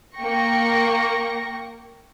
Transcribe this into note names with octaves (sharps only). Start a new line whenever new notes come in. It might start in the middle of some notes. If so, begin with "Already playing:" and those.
A#3 A#4 G5 C#6 A#6 C#7